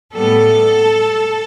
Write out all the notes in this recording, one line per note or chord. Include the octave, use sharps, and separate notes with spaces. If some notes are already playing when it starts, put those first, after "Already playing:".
A2 G3 B3 A4